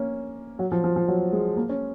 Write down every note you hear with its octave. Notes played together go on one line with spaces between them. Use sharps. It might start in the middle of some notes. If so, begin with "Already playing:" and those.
Already playing: A#3 C#4
F#3
F3
F3
F3
F#3
G#3
A#3
C#4